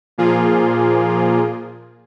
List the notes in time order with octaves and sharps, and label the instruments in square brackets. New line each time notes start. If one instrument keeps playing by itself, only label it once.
[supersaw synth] A#2 F3 A#3 F4 G#4